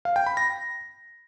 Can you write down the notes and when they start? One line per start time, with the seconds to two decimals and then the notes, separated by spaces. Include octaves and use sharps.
0.05 F5
0.16 G5
0.26 B5
0.37 A#6